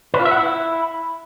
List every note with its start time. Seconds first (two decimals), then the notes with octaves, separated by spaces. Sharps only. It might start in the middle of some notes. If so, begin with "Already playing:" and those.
0.14 B4
0.20 F4
0.25 E5
0.31 F#5
0.37 E4